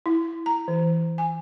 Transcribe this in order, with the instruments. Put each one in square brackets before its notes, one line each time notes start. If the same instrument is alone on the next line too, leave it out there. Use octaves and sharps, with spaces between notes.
[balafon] E4
A#5
E3
G#5